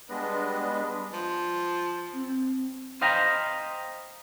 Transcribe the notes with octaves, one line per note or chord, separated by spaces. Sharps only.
G3 G#3 B3 D4 B4 D#5
F3
C4
C5 D#5 F5 G5 A#5 B5